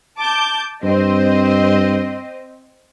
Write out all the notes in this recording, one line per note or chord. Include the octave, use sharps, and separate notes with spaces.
A5 D6 G6
G2 C4 C5 D#5